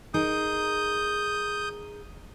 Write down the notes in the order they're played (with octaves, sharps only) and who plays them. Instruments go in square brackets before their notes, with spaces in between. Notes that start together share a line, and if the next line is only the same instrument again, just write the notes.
[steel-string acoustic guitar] D#4 G#4 A#4 [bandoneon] D#6 G6